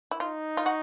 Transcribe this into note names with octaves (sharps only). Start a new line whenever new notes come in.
E4
D#4 F4
F4
F#4